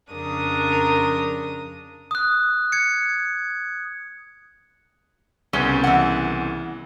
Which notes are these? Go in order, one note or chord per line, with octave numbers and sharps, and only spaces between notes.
F2 C#3 D4 A#4 D#6
D#6 F#6
G#6 C#7
C2 C#3 B3 C#4
E3 F#5